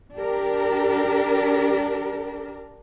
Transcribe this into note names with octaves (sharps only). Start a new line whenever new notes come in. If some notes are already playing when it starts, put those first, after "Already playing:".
D4 G4 A#4